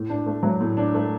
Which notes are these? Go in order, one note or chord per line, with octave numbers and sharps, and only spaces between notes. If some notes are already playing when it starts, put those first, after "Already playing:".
Already playing: A2
D4
A3
F#3
A2
D4
A3